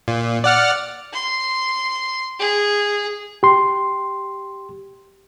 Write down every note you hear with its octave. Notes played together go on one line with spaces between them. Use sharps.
A#2
D5 F#5 F6
C6
G#4
G4 C6